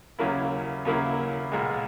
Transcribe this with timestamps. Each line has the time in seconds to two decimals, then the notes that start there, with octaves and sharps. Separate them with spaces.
0.19 D#2 C#3 F#3 A#3 E4
0.85 D#2 C#3 F#3 A#3 E4
1.52 B1 A#2 G#3